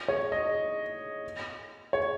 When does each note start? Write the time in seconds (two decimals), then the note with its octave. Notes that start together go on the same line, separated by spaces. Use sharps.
0.08 C#5
0.32 D#5
1.93 C#5